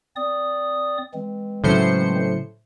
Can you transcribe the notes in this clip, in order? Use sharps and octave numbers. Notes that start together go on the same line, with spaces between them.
C4 D5 D#6
E3 G#3 C4
A2 C#3 F#3 C#4 C5 C#7